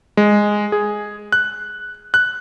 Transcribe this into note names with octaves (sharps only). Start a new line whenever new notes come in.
G#3
G#4
F#6
F#6